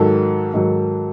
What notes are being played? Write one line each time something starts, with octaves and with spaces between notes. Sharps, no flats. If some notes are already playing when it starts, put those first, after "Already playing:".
Already playing: G#2 D#3 F#3 A4
G#2 D#3 F#3